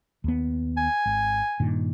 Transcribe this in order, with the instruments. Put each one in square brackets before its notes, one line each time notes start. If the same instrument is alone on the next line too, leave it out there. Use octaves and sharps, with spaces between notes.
[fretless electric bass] D#2 B3
[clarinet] G#5
[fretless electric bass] G#1
G2 A#2 D#3